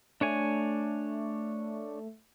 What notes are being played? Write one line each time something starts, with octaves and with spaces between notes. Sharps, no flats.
A3 D4 C#5 G#5